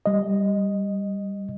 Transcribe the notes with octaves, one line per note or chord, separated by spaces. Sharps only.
G3 D#5